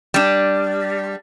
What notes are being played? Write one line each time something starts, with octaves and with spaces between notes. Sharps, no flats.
G3 D4